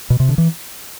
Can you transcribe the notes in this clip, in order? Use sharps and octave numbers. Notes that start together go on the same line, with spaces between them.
B2
C3
D3
E3